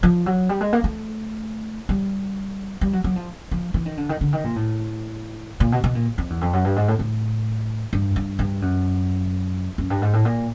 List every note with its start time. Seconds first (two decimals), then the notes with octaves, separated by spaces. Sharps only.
0.03 F3
0.26 F#3
0.49 G3
0.61 G#3
0.73 A#3
0.84 A3
1.89 G3
2.81 G3
2.93 F#3
3.04 F#3
3.16 F3
3.51 F3
3.74 E3
3.86 D#3
3.97 D3
4.09 D#3
4.21 D3
4.33 D#3
4.44 A#2
4.56 A2
5.60 A#2
5.72 B2
5.84 B2
5.95 A#2
6.18 F2
6.30 E2
6.41 F2
6.53 F#2
6.65 G2
6.76 G#2
6.88 A2
6.99 A2
7.93 G2
8.16 G2
8.39 G2
8.62 F#2
9.78 F#2
9.90 G2
10.02 G#2
10.13 A2
10.25 A#2